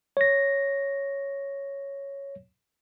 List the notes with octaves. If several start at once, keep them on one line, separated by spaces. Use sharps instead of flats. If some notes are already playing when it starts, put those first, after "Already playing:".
C#5 A#6